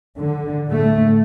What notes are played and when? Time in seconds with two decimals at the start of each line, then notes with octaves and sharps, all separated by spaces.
0.19 D3
0.69 A2 A3